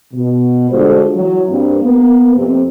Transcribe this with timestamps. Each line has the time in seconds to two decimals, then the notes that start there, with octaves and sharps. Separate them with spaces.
0.14 B2
0.71 D3 G3 G#3 F4 F#4 C5
1.15 E3 F#3
1.49 G2 A#3 C4
1.83 A#3 B3
2.35 F2 C3 C4